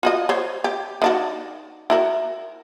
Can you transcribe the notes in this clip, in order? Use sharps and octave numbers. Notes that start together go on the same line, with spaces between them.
F4 F#4 D#5
C5 C#5
G4
D#3 D4 F#4
E4 F#4 A#4